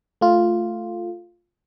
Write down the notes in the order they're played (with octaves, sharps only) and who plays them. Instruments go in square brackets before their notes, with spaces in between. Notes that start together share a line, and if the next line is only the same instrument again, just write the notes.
[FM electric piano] A3 F4